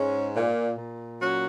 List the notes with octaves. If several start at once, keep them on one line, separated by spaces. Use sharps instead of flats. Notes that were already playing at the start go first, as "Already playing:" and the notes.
Already playing: G#2 G#3 C#4
A#2
A#2
F#3 C#4 F#4